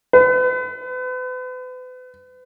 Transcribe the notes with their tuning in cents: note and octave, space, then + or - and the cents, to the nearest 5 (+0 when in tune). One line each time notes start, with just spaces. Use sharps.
B4 +40